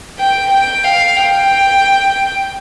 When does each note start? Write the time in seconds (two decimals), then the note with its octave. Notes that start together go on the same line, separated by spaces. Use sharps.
0.19 G5
0.51 G5
0.84 F5
1.16 G5